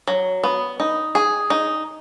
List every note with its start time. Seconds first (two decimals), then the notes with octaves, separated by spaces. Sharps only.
0.08 F#3
0.44 B3
0.80 D#4
1.15 G#4
1.50 D#4